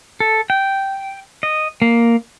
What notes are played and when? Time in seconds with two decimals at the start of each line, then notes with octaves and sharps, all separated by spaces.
0.20 A4
0.50 G5
1.43 D#5
1.82 A#3